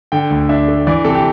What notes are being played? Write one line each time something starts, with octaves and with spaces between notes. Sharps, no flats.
D3 G5
D2
D4 E5
A3
E3 D5
C3 A4
G4